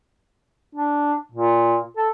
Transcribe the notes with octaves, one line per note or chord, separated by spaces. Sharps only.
D4
A#2
A4